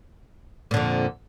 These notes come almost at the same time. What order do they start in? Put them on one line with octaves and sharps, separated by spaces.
A#2 D3 F2